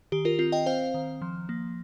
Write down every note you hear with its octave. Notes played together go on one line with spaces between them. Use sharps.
D#3 G4
F4 A#4
C4 F4
D#5 G5
C4 C5 F5
D#3
F3
A#3